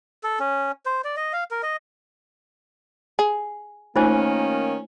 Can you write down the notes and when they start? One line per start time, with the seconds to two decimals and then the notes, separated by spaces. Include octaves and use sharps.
0.24 A4
0.39 C#4
0.86 C5
1.04 D5
1.17 D#5
1.33 F5
1.51 A#4
1.63 D#5
3.19 G#4
3.96 D#3 A3 A#3 C#4 D#4 F4 C5 G#5